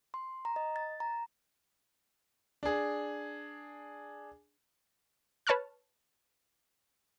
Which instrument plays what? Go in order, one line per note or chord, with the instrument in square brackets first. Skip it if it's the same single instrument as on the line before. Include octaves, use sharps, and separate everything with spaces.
[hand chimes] C6
A#5
D#5
A6
A#5
[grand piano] D4 G#4
[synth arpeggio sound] B4 C#5 A5 C#6 F6 F#6